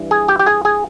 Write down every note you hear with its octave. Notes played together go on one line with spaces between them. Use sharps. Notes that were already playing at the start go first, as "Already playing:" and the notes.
Already playing: G2 E3
G#4
G4
G4
G#4
G#4